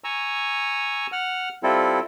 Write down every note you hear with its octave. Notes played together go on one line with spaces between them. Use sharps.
G#5 A#5 C#6 E6
F#5 F6
G3 C4 E4 F4 A4